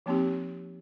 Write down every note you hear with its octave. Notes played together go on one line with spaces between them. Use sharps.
F3 A#3 C4 D#4 G4